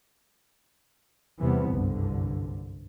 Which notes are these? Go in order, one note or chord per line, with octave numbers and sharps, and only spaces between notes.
E2 C3 E3 G3 B3 C4
F#1 C2 G2 D3